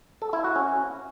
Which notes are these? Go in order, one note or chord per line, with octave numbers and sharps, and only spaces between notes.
A4
E4
F#4
C#4